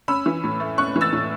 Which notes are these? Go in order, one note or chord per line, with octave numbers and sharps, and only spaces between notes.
C#4 B5 E6
E3
A2
A3
C#4 C#6 F#6
E3
E6 A6
A2